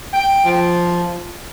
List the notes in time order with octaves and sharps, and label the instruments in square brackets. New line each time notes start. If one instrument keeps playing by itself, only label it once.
[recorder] G5
[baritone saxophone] F3